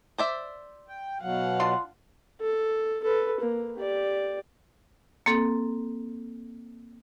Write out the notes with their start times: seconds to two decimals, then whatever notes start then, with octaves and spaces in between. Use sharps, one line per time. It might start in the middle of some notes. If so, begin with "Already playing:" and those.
0.18 C5 D5 E5
0.88 G5
1.22 B2 F#3 F5 F#5
1.60 D4 F4 C6
2.41 A4
3.04 A4 B4
3.40 A#3
3.77 G4 D5
5.26 A#3 C4 A4